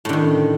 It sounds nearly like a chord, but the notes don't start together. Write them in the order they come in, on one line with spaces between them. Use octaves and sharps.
A2 D3 D#3